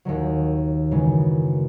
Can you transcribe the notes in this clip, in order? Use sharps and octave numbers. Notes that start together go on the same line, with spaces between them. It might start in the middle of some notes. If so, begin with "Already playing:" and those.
D#2 D#3 F#3
F#2 C#3 E3 G#3